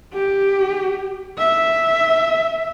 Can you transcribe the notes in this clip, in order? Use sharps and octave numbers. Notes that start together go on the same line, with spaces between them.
G4
E5